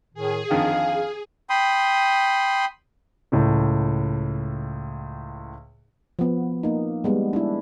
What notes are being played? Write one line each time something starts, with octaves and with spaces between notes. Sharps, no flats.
A2 D#3 G#4
F2 D3 D#3 F5
G5 B5 C6 D#6
C#2 A2
F3 B3
A#3 D#4
G3 G#3 B3
D4 E4